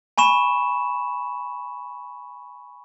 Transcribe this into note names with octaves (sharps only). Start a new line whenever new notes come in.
G#5 B5 C#6 E7